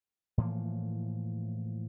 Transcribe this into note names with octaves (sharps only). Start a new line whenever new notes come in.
A2 E3 F3 A#3